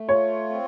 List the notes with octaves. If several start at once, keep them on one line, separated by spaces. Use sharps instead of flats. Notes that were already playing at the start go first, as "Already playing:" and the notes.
Already playing: A3
F4 C#5
C4